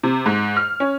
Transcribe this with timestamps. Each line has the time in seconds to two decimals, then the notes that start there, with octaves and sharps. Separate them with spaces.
0.03 C3
0.26 G#2
0.57 F6
0.80 C#4